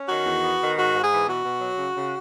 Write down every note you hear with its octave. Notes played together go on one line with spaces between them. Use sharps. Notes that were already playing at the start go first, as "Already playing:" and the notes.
Already playing: C#4
D#3 F#4
E2
B3
D#3
G#2 F#4
G#2
G#4
E3
B2 F#4
B2
F#3
C#3
C#3